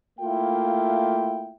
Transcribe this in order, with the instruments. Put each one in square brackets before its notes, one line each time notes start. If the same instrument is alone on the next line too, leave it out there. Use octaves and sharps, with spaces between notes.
[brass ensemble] A3 A#3 E4 F4 G5